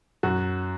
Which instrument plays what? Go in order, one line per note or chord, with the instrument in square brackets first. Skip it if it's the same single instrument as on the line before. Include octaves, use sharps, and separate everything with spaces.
[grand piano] F#2 F#4